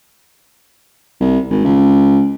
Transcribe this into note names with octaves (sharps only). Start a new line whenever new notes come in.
C2
G#1
C#2